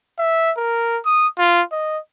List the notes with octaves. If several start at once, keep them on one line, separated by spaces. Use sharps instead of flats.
E5
A#4
D#6
F4
D#5